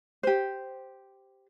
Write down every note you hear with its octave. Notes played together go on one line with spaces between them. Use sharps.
G4 C5